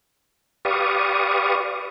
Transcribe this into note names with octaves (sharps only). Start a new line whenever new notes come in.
G4 B4 D5 F5 C#6 D#6